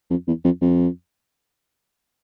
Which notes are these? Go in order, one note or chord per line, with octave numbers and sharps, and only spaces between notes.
F2
E2
F2
F2